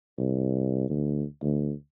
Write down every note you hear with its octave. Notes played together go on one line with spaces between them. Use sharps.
C2
D2
D2